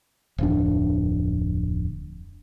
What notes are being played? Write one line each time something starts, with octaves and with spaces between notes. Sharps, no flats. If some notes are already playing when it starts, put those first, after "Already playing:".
D1 F2 D4